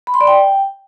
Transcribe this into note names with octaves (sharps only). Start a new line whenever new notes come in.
B5
C6
D5
G5